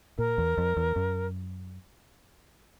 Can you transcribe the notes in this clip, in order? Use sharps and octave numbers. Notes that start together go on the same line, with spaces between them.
A#2 A#4
E2
F2
E2
F#2